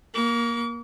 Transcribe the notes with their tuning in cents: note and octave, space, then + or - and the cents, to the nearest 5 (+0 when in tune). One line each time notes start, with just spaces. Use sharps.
A#3 +15 D6 -45